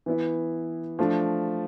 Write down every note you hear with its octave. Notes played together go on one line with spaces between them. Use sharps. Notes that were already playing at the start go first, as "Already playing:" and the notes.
E3 B3 E4
F3 A3 D4